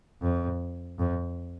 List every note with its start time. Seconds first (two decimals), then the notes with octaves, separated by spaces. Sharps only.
0.22 F2
0.99 F2